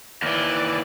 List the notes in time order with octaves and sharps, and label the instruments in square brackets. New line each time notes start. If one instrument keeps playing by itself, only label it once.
[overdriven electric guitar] D#2 E3 [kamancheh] D5